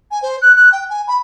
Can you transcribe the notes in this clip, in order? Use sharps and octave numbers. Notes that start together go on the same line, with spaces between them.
G#5
C5
F#6
F#6
G5
G#5
B5